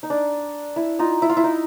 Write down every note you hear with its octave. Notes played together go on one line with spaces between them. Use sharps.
D#4
D4
E4
D#4 F4
E4
F4
E4
D#4